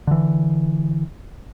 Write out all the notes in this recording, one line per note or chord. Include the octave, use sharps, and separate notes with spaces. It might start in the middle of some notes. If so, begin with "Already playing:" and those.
D3 E3